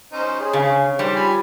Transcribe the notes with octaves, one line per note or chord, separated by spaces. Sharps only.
C#4 D#4 C5
G#4 C#5
C#3
G3 D#4 C5 G5
F4 G4 G#5 B5